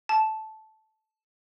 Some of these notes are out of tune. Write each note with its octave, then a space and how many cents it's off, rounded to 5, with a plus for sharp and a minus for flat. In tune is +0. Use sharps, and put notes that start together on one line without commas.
A5 -10